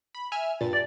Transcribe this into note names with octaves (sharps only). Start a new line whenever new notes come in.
B5
E5 G#5 F6
G2 A#2 A6
D5